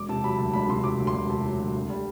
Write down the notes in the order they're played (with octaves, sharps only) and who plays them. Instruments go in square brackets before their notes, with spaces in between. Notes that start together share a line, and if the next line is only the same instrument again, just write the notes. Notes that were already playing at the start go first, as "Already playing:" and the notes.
Already playing: [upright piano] E1 D6
C3 A5
F#3 B5
D2 A5
E1 B5
C3 C6
F#3 D6
D2
C6
E1
C3 A5
F#3
D2
D2
G3